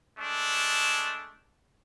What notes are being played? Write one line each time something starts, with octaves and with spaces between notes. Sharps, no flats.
G#3 A3 D4